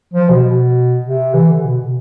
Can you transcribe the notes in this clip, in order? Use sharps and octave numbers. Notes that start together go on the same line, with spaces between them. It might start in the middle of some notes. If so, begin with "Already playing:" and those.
F3
B2
B2
C3
E3
D3
B2
B2